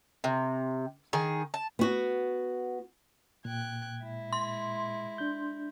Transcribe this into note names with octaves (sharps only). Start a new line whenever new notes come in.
C3
D#3 G#4
A5
B3 F#4
A#2 G5 F#6 G#6
G#3 E4
C6
D4 G6